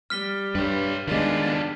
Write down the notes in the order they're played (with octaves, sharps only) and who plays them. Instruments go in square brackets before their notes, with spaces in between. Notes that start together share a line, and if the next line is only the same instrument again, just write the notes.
[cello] G3 [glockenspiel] F6 B6 G7
[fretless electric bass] G2 [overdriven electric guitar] B4 C#5
[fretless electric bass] D#3 G#3 [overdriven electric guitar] G3 F4 [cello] B3 D4